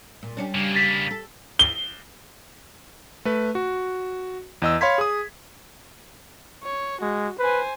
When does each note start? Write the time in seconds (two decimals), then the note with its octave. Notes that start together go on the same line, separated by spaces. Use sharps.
0.23 A#2
0.37 G3 C#4 D4
0.55 C#3 A#3
0.75 A6 B6
1.11 A4
1.59 G7
3.25 A3 B4
3.55 F#4
4.62 E2 D#5 E6
4.81 C#5 F5 B5 C6 G#6 B6
4.98 G#4 D#6
6.63 C#5
7.01 G#3 F#4
7.39 B4 C5 G#5